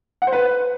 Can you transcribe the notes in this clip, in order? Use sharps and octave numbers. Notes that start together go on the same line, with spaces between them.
F#5
C5
B4